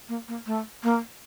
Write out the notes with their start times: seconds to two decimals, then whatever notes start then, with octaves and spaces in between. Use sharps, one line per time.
0.09 A#3
0.28 A#3
0.46 A3
0.83 A#3